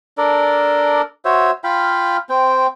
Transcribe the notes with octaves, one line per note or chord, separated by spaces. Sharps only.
D4 A4 A#4 D5
F#4 C5 C#5 E5
F4 F5 G5 B5
C4 G5